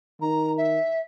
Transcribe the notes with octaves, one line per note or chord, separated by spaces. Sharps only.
D#3 A#5
E5